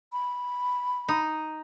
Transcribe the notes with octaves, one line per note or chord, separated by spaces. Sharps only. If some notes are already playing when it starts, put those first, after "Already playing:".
B5
D#4